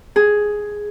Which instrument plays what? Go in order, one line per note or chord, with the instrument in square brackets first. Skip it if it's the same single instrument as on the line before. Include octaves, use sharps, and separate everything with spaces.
[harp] G#4